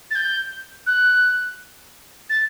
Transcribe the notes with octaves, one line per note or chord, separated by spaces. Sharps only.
A6
G6
F#6
A6